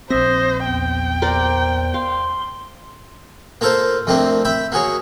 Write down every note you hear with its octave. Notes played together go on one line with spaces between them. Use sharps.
A#1 C4 C5 E5 D#6 A#6
E2 G5
A#4 C5 D5
F5 C6
A#3 F4 A4 A#4 C5
F2 A3 A#3 C4 D4
E5 G5 B5
A#3 F#4 G#4 C#5